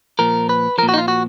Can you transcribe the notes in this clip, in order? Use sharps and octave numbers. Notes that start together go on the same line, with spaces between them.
A#2 F3 A#4
B4
A#2 F3 A#4
F#4
D#4
F4
F#4